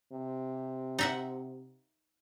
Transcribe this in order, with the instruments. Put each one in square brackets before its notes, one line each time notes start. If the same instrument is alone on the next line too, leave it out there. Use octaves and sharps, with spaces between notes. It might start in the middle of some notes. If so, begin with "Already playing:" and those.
[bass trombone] C3
[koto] D#4 E5 F#5